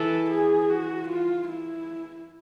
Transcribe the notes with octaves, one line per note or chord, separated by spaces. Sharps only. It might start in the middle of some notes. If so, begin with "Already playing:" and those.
Already playing: E3 A4
G#4
F#4
F4
E4